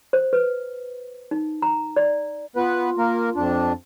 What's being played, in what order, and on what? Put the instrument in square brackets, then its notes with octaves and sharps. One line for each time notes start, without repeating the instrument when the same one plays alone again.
[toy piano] C5
B4
D#4
A#5
D5
[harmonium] B3 B4 [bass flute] F4
[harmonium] A#3 A#4
F2 D4